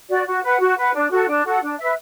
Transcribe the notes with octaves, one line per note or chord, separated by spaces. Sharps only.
F#4 D5
F#4
B4 F#5
F#4
B4 F#5
D4
F#4 A4 F#5
D4
F#4 A4 F#5
D4
B4 E5